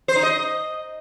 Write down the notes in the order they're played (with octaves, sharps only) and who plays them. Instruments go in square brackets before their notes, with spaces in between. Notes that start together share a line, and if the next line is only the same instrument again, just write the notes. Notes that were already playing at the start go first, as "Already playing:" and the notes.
[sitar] C5
D#4
D#5